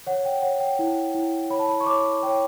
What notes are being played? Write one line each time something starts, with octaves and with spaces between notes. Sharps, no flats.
C#5 F#5
G5
C#5 F#5
G5
E4
E4
C#5 B5
A5
B5
C#6
C#5 D6
C#5 G5